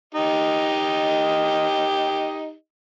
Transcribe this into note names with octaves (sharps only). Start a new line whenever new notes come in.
D#4 G4 D#5